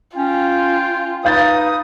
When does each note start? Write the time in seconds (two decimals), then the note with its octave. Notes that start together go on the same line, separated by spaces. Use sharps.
0.17 C#4 F4 G5
1.25 D#4 B4 F5 D#6 G6 A6